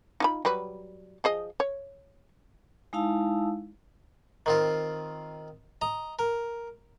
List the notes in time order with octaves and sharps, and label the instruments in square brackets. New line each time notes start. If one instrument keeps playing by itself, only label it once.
[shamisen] D#4 F4 B5
F#3 G3 B4
F3 G#4 D#5
C#5
[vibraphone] G#3 D#4 E4 F5 A5 E6
[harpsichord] D#3 C4 F4
D#5 A#5
A#4